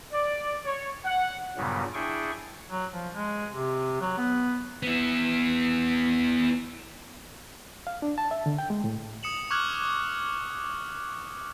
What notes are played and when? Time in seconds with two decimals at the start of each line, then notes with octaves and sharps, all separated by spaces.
0.12 D5
0.64 C#5
1.05 F#5
1.57 G2 A#2 C#3 F#3 G3 B3
1.94 D4 E4 G#4 G5 C#6
2.71 F#3
2.92 F3
3.14 G#3
3.52 C3
4.01 F#3
4.18 B3
4.83 B3 E4
7.87 F5
8.02 D4
8.18 A5
8.31 E5
8.46 D3
8.58 G5
8.70 G#3
8.84 A2
9.23 D#6 C#7 E7 F#7
9.50 C#6 D6 F6 F#6 G#6 F#7